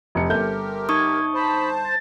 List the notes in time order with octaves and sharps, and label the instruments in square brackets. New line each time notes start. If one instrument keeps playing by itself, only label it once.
[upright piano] F1 C#7
[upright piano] G1 A4 G6 [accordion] G4 A#4
[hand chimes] D#4 C#6 D#6 [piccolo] G#6
[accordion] C5 A5 [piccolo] B5
[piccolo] A6